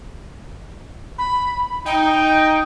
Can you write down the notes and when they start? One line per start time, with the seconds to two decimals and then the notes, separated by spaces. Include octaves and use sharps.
1.18 B5
1.86 D#4 G5